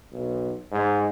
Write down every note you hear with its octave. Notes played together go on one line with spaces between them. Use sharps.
B1
G#2